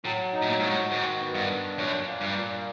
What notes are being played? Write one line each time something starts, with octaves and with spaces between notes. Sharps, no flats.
A2 F#3
D#4
A2
A#2
G#2 F#4
A2
G#2 D#3
B3
G2
D4
F#2 A#2
A#3
G2
A#2